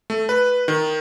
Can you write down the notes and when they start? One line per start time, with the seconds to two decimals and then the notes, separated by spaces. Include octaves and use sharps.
0.10 A3
0.29 B4
0.68 D#3